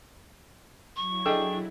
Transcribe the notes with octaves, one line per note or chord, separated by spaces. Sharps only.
F#3 E4 C#6
D4 G#4 A4 D#5 G5